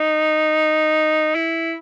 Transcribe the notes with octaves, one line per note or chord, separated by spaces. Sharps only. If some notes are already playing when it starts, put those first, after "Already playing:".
Already playing: D#4
E4